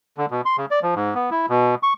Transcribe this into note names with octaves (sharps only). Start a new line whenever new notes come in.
D3
B2
C6
C#3
D5
F3
G#2
B3
E4
B2
C#6